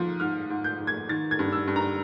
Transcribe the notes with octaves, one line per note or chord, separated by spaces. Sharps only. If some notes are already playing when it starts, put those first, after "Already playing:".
Already playing: G#2 F3
G#2 F6
G#2
G6
G#2
G#6
D#3 A6
G#6
G2
E6
G2
A#5